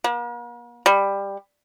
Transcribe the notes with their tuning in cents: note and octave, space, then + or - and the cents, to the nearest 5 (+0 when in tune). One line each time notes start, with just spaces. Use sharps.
A#3 +45
G3 +15